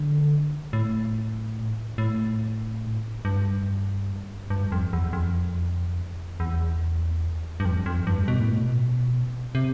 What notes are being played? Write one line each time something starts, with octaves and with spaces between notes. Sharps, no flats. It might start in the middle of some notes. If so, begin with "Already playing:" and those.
Already playing: D3
A2
A2
G2
G2
F2
E2
F2
E2
G2
F2
F2
G2
B2
A2
B2
C3